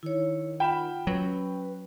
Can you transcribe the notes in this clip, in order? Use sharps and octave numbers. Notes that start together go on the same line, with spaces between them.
D#3 E4 C#5
F4 F#5 G5 B5 E7
F#3 C#4 B4